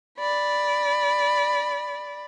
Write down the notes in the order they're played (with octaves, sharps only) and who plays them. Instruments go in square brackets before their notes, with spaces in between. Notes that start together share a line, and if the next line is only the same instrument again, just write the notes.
[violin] D5 B5